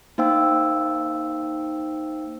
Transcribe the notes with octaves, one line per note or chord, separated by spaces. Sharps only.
A#3 D#4 C5 F5 G5 E6